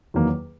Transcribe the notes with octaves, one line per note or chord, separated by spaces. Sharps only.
E2 D#3 F#3 A#3